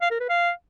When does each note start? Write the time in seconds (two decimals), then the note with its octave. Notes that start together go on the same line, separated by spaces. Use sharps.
0.01 F5
0.11 A#4
0.20 B4
0.29 F5